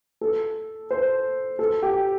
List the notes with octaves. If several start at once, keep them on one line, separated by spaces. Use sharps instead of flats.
A4
C5
A4
G4